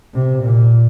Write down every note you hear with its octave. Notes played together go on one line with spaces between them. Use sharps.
C3
A#2